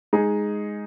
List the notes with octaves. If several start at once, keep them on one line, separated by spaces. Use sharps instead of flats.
G#3 D#4 G#4